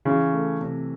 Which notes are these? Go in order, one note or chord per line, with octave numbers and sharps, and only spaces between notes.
C#3 E3
A3
C3